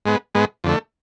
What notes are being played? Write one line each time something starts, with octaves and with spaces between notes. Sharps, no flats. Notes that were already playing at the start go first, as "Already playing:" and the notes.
G#2 G#3 B3
G#2 G#3 B3
F2 D3 A3